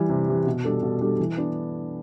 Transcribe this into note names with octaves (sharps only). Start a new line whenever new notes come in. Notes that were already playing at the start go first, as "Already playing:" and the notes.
Already playing: E3 G3
C3
E3 G3
B2
G3 D4 A4
B2
G3 D4 A4
E3
B3 D4